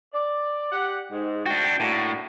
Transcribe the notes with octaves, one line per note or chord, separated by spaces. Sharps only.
D5
G4 F#5
G#2
D4 F#4 G5
A2 A#3 D4 F#4